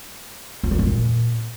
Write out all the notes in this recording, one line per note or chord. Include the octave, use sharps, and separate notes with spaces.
F2
D#3
F2
A#2